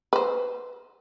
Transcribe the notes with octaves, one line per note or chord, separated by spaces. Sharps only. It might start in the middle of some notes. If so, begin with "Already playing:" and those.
B4 C5